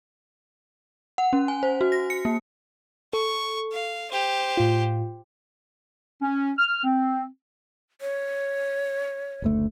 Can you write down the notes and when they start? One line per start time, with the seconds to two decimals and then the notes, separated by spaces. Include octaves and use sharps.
1.18 F#5
1.33 C#4
1.48 G#5
1.63 C5
1.81 F#4
1.92 A#6
2.10 C#7
2.25 A#3
3.13 A4 C#6
3.72 F5
4.12 G4 C5
4.57 A2 F4
6.22 C#4
6.58 F6
6.84 C4
8.01 C#5
9.42 F#1 D2 A3